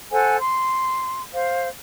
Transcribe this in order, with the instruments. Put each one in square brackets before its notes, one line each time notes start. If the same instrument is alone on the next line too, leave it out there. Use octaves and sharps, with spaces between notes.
[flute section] A4 C5 F#5 G#5
C6
C5 F5